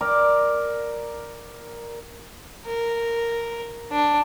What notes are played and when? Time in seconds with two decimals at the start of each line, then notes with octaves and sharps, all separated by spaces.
0.01 A#4 D5
2.66 A#4
3.92 D4